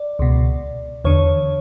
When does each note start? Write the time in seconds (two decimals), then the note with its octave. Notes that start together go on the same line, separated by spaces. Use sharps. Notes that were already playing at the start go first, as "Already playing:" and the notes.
Already playing: D5
0.19 C#2 B2
1.04 E2 D3 C#5